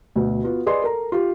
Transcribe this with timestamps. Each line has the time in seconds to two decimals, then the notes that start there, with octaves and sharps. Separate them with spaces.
0.16 D2 B2
0.44 B3 F4 F#4
0.66 G#4 B4 D5 D#5 C6
0.82 A4 A#4 A#5
1.12 F4 G4